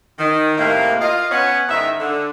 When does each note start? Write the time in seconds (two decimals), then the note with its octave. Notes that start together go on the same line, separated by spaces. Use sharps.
0.18 D#3
0.57 A2 C3 D#3 A3 A#3
1.01 F4 D#5 F5
1.31 B3 C#4 F#5
1.69 G#2 D#3 D#4 E5
2.00 D3